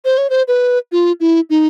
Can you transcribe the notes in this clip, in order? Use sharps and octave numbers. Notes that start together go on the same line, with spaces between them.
C5
C#5
C5
B4
F4
E4
D#4